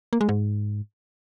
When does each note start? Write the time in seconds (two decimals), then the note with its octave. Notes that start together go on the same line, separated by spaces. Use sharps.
0.13 A#3
0.21 G#3
0.29 G#2